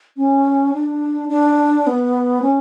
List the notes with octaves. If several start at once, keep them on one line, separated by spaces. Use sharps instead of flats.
C#4
D4
D4
B3
C#4